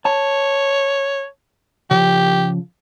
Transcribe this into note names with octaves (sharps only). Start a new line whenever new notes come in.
C#5 A5
C#3 F3 G4